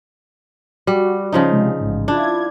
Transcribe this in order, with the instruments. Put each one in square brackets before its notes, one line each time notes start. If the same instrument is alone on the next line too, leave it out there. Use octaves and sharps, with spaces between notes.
[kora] G3 [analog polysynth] F#4
[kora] C#3 F3 D#4
[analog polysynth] C3 G#3
A1 G#2
[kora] D4 [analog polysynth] E4 F4 G#6